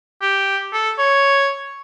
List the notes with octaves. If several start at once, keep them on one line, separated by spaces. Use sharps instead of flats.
G4
A4
C#5